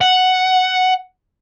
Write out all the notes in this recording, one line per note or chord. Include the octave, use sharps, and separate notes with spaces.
F#5